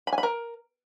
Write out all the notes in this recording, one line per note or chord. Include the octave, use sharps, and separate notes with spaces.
B5
G#5
B5
A#4